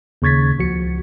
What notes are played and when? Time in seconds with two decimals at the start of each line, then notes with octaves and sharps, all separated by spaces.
0.22 D#2 C#3 C#6 G#6 A6 B6
0.59 C#2 F3 F#4 C#7